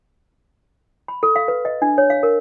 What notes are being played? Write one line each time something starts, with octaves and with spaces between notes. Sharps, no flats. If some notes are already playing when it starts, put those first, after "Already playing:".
B5
A4
F5
B4
D#5
D4
C#5
F5
A#4